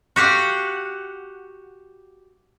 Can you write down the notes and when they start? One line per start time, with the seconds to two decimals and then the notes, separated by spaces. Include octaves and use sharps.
0.16 F#4 G4 F5 F#5